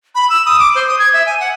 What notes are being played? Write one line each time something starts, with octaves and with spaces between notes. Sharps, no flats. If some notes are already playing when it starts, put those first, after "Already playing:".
B5
E6
D#6
D6
C5
D#6
G#6
E5
G#5
F#5